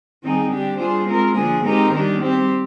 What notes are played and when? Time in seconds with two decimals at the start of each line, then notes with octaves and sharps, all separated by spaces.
0.22 D#3 G3 C4 D#4 G#4
0.50 D3 G3 D4 G4
0.78 G3 D4 F4 G#4 C5
1.07 G#3 C4 F4 A#4
1.35 D3 F3 A#3 D4 G#4
1.63 G#3 C4 D#4 G4 A#4
1.91 D#3 G3 D4 G4
2.20 G3 C4 G4